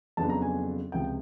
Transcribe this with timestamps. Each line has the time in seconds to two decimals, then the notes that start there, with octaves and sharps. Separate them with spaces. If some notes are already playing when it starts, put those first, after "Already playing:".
0.17 F2 C#3 F#3 B3 D4 A5
0.30 A#5
0.42 G#5
0.92 C#2 C3 F3 G5